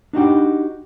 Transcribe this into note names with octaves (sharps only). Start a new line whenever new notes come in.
D4 D#4 F#4 G4